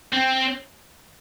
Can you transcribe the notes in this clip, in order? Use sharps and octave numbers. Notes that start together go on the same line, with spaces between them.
C4